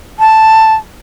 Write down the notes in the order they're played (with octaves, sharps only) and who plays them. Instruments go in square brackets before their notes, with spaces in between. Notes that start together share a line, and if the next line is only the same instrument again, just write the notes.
[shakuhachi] A5